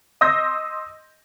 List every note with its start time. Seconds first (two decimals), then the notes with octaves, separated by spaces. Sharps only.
0.21 D#5 C6 D#6 E6 G6 A#6